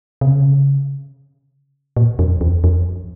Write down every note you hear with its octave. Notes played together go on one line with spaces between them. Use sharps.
C3
C#3
A#2
F2
E2
F2